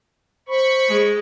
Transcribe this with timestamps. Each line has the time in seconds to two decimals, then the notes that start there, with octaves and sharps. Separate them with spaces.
0.48 C5 B5 C#6
0.89 G#3